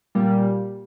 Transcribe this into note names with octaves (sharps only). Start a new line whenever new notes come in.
A#2 G3